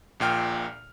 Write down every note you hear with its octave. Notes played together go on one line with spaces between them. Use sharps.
A#1 A#2 G5 F6